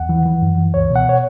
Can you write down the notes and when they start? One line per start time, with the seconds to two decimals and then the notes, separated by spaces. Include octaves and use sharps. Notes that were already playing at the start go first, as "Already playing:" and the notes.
Already playing: E2 F#5
0.09 E3
0.25 E3
0.41 F#2
0.58 E3
0.74 C#2 C#5
0.90 B2
0.96 F#5
1.09 C#5